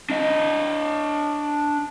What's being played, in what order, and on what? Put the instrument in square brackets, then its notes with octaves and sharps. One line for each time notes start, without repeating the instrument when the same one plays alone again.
[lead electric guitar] D4 D#5